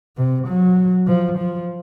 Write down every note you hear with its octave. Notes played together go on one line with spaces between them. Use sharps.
C3
F#3
F3
F3